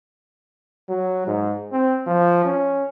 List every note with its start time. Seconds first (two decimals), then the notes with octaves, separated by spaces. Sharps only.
0.89 F#3
1.27 G#2
1.72 C4
2.07 F3
2.46 C#4